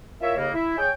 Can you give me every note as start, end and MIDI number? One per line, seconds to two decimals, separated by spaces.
0.21 0.35 64
0.21 0.35 65
0.21 0.35 70
0.21 0.35 73
0.21 0.35 76
0.37 0.49 39
0.37 0.49 49
0.37 0.49 58
0.54 0.77 64
0.77 0.90 68
0.77 0.90 73
0.77 0.90 79